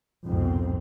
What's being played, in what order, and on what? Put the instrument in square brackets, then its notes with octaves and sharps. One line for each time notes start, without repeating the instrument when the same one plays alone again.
[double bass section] C2 F2 G#2 B2 C4